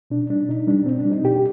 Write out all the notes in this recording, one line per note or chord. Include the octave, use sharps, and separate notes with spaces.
B2 D4
G3 D4
B2 D#4
G3 D4
B2 C4
D4
G3
D#4
B2 G4